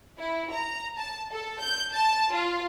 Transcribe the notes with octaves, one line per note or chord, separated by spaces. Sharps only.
E4
A#5
A5
A4
G6
A5
F4